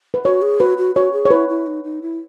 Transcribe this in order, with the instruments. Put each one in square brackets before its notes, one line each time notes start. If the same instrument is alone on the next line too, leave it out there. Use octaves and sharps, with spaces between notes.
[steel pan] B4
[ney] F#4 [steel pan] C#5
[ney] G#4
[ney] F#4 [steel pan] B4
[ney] F#4
[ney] F#4 [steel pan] C#5
[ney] G#4
[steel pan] C#5
[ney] E4 [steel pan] B4
[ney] E4
D#4
D#4
E4